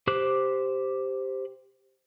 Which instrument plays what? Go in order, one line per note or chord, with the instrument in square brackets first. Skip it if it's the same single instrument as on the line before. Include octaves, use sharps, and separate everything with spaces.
[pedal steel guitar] G4 C5 D6 F#6